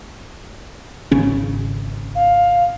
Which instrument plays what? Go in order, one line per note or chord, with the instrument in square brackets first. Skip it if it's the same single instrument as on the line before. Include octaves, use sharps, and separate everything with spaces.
[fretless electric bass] G#1 C#3 C#4
[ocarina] F5